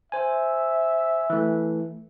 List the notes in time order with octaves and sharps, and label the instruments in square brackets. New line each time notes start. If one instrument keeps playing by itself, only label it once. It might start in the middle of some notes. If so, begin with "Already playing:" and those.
[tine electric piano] C5 G#5 [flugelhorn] E5
[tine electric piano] E3 A3